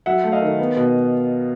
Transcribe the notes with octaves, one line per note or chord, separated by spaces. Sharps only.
F#3 E5 F#5
A3
D#5 F5
D#3
B3
B2